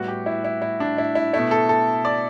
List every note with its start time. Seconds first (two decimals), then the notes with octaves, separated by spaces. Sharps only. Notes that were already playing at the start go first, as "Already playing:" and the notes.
Already playing: A2 G3 B3 F#4
0.08 G4
0.26 E4
0.45 E4
0.62 E4
0.80 D4
0.98 E4
1.15 E4
1.33 B2 A3 E4
1.51 A4
1.69 A4
2.05 D5